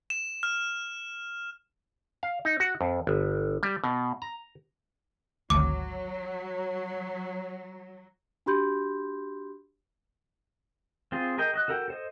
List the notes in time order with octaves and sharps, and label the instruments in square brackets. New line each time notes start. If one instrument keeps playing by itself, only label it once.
[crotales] E7
F6
[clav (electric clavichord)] F5
D#4
F#4
F2
G1
G3
B2
A#5
[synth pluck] G#1 D2 [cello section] F#3 [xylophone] D6
[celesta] D4 F#4 G4 B5 C6 G6
[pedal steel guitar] C4 F4 G#4
G#4 A#4 D#5 G5
F#4 D#5 F#6
F#4 A4 A#4 F#5 G5
A4 C5 D#5